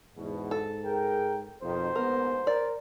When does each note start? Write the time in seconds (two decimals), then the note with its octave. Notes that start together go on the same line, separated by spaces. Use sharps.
0.16 E2 G#2 B2
0.51 A4
0.84 G#4 A#4 G5
1.63 F2 B2 D#3 C5
1.96 A#1 D#2 G#2 B3 A#4
2.47 A#4 D5